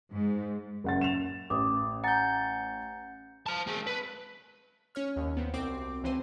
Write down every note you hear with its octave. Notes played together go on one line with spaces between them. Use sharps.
G#2
F#1 F#5 A6
E7 F7
A1 D6 D#6
F#5 G#5 A#5 G6 A6
F5 A5
G#3 A5
B4
C#4 C#5 F6
D#2
B3 C4
C2 C4 F#4 D6
C#2 E3 C4 C5 D#7